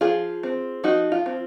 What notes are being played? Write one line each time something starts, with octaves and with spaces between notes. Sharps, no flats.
F3 F4 G#4
C4
F3 D#4 F#4
F4
C4